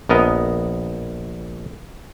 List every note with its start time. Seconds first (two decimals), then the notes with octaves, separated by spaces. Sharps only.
0.09 A#1 B3 A#4 D#5